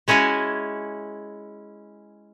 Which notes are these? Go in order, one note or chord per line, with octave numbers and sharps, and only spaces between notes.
G#3 C#4 E4 F#4 G#5